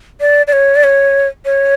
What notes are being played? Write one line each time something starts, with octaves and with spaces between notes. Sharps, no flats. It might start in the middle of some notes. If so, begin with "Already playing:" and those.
D5
D5
C#5
D5
C#5
C#5